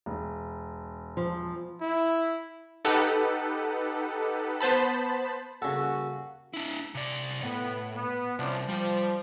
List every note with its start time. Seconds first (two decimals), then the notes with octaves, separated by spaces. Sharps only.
0.06 E1
1.17 F3
1.81 E4
2.85 D#4 G4 A4 B4 F#5
4.61 B3 C5 A5 B5
5.62 C#3 G3 A#3 F#4 A4 F#5
6.54 D4 E4
6.95 C3 D5
7.42 A2 B3
7.95 B3
8.39 C2 F3 C#4 D4
8.68 F3 G3